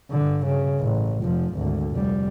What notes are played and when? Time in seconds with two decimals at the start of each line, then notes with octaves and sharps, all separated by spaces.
0.10 G2 D3
0.46 C#3
0.80 A1
1.22 F1 F3
1.54 G#1 D2
1.92 F1 G3